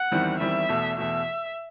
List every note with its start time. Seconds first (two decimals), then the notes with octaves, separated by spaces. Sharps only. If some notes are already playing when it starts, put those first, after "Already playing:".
Already playing: F#5
0.11 E2 D#3 G3 C4 E4
0.40 E2 D#3 G3 C4 E4 E5
0.69 E2 B2 A3
0.97 E2 B2 A3 E5